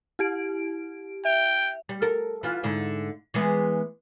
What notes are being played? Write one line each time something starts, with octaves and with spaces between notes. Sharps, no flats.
E4 G4 D7
E5 G5
G3
A4 A#4
E3 F4
G#2 D3 E4
E3 G#3 B3